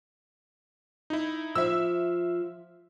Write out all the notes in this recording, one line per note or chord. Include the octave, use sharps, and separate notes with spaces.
D#4 E4
F3 E5 E6